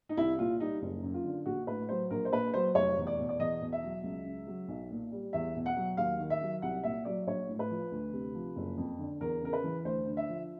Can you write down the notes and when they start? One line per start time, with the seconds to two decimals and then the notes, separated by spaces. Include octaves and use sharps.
0.09 D#4
0.17 C2 E4
0.38 A#2 F4
0.59 G3 D#4
0.82 F#1
1.03 F#2
1.14 F4
1.25 D3
1.46 A#1 F#4
1.67 A2 B4
1.89 F#3 C5
2.10 A#1 A#4
2.25 C5
2.32 A#2 B4
2.54 F#3 C5
2.75 F1 C#5
2.97 E2
3.07 D5
3.18 B2
3.29 D5
3.39 E2 D#5
3.61 B2
3.72 E5
3.83 F#3
4.04 C#2
4.25 C#3
4.47 F#3
4.68 B1
4.91 A#2
5.12 G3
5.33 E2 E5
5.55 B2
5.66 F#5
5.76 F#3
5.97 D#2 F5
6.19 D#3
6.30 E5
6.41 F#3
6.62 C2 F#5
6.83 A#2 E5
7.05 F#3 D5
7.27 A#1 C#5
7.49 A2
7.59 B4
7.70 F3
7.92 D2
8.13 C3
8.35 F3
8.56 F#1
8.77 F2
8.99 D3
9.21 E2 A#4
9.42 C#3 A#4
9.53 B4
9.64 E3
9.85 D2 C5
10.07 D3
10.17 E5
10.28 F3